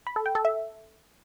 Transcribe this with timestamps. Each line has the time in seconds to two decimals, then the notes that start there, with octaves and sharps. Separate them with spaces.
0.07 B5
0.16 A4
0.26 G5
0.35 A4
0.45 E5